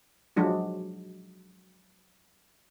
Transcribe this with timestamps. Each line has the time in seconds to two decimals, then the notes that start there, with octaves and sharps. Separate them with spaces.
0.36 F3 F#3 G#3 D4 F#4